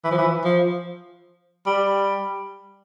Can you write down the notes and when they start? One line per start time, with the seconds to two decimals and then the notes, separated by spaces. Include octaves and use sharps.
0.04 E3
0.11 F3
0.18 E3
0.45 F3
1.66 G3